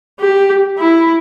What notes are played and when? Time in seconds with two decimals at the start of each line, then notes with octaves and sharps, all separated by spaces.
0.20 G4
0.79 E4